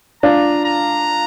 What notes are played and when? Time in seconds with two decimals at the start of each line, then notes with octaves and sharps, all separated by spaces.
0.23 D4 F4 A#5
0.65 A#5